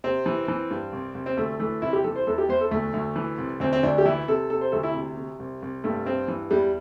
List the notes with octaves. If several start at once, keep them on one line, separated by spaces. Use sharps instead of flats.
C3 C4
E3
E3
G2
C2
C2
C4
D2 A3
E3 A3
C2 E4
G4
E3 A4
C5
E2 A4
G4
E2 C5
A4
D2 A3
D2
E3
C2
D2 C4
C4
D2 D4
G4
E3 E4
C3 A4
C3 A4
C5
D2 A4
E4
C3
C3
C2
C2
G2 A3
G2 C4
E3
E2 G3